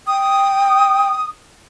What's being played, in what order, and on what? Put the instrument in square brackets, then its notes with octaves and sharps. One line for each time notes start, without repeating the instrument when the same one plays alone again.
[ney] G5 [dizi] D#6